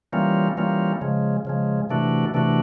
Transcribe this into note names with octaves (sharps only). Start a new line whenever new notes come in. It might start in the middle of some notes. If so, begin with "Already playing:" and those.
E3 G3 A#3 C#4 F4
E3 G3 A#3 C#4 F4
C#3 F3 G#3
C#3 F3 G#3
C3 E3 A3 D4 F#4
C3 E3 A3 D4 F#4